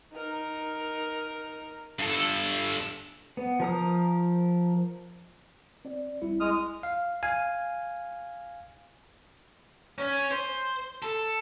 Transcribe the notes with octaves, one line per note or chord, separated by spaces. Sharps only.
D#4 A#4
G2 A4
B3
F3 A#4 D#6
C4 D5
A1 G3 E4
G#3 D#6 F6
F5
F5 G#5
C#4
C5
A4